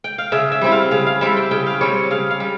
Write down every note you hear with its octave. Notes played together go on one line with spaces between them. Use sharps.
G5
F5
C#3 E5
E5
G3 C4 E4
F5
C#3 F5
F5
G3 C4 E4 E5
G5
C#3 G5
F5
G3 C4 C#5
C#3 F5
F5
G3